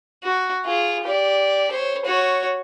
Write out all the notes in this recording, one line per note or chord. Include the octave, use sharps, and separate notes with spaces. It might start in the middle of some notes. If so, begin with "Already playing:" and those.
F#4
F4 G#4
G4 D5
C5 C#5
F#4 C#5